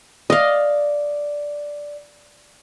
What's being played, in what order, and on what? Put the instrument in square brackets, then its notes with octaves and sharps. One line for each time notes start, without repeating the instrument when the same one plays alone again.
[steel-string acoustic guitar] D5 [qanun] D#5 F5